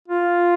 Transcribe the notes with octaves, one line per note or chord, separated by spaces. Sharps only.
F4